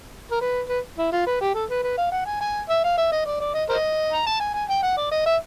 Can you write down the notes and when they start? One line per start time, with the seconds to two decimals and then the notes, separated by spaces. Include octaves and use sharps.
0.31 A#4
0.41 B4
0.69 B4
0.98 E4
1.12 F4
1.27 B4
1.41 G4
1.54 A4
1.70 B4
1.83 B4
1.98 F5
2.12 F#5
2.26 G#5
2.41 G#5
2.69 E5
2.84 F5
2.98 E5
3.12 D#5
3.26 D5
3.40 D5
3.54 D#5
3.69 A#4 C5 D#5
4.13 A#5
4.26 A5
4.40 G#5
4.54 G#5
4.69 G5
4.83 F#5
4.97 D5
5.11 D#5
5.26 E5